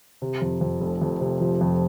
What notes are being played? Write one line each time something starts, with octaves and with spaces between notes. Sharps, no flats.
C3
F2
F2
F1
F2
C3
F3
F2